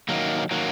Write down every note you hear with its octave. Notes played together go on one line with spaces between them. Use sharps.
D#3 F#3 A#3
D#3 F#3 A#3